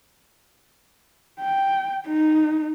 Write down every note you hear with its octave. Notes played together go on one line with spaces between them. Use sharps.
G5
D#4